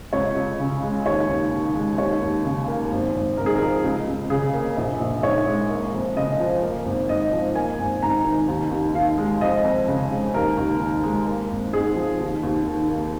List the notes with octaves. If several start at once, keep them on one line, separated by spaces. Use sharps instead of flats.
C#2 C#5
C#2
C#3
G#3
D#2 C#5
D#2
D#3
G#3
D#2 C#5
D#2
C#3
A#3
G#1
G#1
G#2 A#4
G#4
A#4
F3
C#2
C#2
C#3 G#4
A#3
A#1
A#1
G#2 C#5
G#3
A#3
F2
C#3 D#5
F3
A#3
G#1
G#2 D#5
F3
A#3 G#5
G#1
G#2 A#5
D#3
D#2
D#2
D#3 F5
G#3
F2 D#5
F2
C#3
G#3
D#2 A#4
D#2
D#3
G#3
A#3
G#1
G#2 G#4
F3
D#2
D#2
D#3
A#3